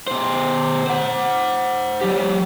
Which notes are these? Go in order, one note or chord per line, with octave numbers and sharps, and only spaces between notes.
B2 C5
C5 F#5
F#3 G4